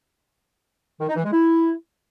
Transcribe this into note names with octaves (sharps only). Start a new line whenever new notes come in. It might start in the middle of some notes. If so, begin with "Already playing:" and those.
D#3
D#4
E3
G#3
E4